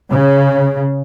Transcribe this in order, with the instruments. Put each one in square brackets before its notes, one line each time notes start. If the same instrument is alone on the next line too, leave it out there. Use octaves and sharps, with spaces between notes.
[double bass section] C#3